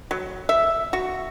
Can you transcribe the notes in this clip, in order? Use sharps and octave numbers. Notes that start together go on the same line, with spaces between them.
F#3
E5
F#4